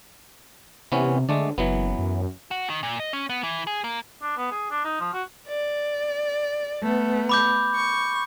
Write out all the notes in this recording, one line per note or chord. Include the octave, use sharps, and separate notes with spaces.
C3 E3 B3 C#4
D3 G#3 A3 D5
F#1 E3 F#3 B3
F#2
F#4
D#3
A#2
D#5
C#4
B3
E3
G#4
A#3
D4
B3
G#4
D4
D#4
F3
F#4
D5
A3 B3
B5 D6 G6
C#6